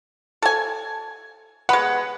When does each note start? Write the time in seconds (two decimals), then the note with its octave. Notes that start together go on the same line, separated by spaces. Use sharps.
0.42 A4 G#5
1.69 G#3 B3 F#5 B5